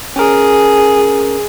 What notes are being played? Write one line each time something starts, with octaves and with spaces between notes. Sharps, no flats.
C#4 G#4 A#4